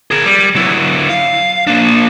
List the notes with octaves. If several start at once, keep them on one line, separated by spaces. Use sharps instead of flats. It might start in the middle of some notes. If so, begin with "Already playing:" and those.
G#4 A#4
G3
F#3 E4
F5
A#3 D4